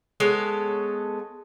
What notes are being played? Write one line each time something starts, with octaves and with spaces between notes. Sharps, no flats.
G#3 B3 A4 C#5